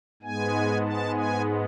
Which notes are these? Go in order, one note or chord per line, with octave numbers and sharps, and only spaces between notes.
G#2 G#3 B3 G#5
A5
G#5